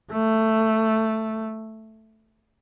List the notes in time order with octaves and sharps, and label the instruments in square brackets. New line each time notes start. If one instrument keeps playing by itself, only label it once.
[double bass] A3